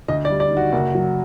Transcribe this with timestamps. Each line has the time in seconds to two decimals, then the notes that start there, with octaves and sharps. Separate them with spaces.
0.08 D2 D#5
0.25 D5
0.30 G3
0.40 D5
0.51 D#3
0.57 F#4
0.73 F#1
0.95 F#3